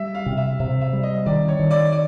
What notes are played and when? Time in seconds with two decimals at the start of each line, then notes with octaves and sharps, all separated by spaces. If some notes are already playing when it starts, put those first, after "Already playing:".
Already playing: G3 E5
0.15 F5
0.26 C3
0.37 E5
0.59 C3 E5
0.81 E5
0.93 G3
1.03 D#5
1.26 D#3 D5
1.48 C#5
1.59 D#3
1.71 D5
1.92 D5